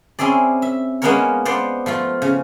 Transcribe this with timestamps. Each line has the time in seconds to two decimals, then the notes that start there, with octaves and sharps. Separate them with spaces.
0.19 C4 C#4 E4 G#4 D5
0.62 E5
1.02 G#3 A#3 B3 C#4 A#4 C#5
1.45 B3 C5 D5
1.86 F3 A3 F4
2.22 C#3